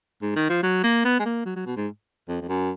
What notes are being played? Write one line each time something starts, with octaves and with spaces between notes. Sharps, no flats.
G#2
D#3
F3
F#3
A#3
B3
G#3
A#3
F#3
F#3
B2
G#2
F2
F2
F#2